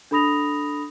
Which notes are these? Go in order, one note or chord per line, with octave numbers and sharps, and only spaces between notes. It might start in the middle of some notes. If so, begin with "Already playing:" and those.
D4 A4 B5 D#6 A#6 F7